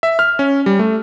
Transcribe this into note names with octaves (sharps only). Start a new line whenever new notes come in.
E5
F6
C#4
G3
A3